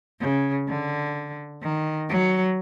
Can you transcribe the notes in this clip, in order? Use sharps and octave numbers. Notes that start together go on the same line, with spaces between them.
C#3
D3
D#3
F#3